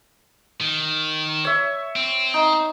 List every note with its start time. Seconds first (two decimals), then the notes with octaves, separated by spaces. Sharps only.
0.61 D#3
1.45 C#5 E5
1.96 C4
2.34 D#4